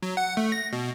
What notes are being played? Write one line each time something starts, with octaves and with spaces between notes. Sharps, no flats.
F#3
F#5
A3
A#6
B2